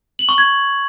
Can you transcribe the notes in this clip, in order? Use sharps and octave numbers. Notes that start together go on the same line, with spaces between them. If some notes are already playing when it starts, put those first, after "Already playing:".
F#7
C#6
G#6